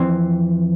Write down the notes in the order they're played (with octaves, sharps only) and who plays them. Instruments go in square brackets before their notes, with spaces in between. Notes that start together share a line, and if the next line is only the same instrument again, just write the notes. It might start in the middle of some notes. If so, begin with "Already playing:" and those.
Already playing: [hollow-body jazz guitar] F2 E3 C4